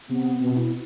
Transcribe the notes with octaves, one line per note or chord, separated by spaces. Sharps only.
C3 B3
B2 C4
E4